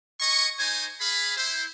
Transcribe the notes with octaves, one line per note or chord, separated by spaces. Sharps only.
D#5 G#5 C#6
D#4 C5 G#5
G#4 F5 B5
E4 C5